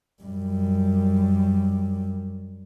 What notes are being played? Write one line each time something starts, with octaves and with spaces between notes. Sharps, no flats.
F#2 G3